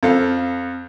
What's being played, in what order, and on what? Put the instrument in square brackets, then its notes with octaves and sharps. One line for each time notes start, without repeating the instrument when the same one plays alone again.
[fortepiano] F2 A4 F5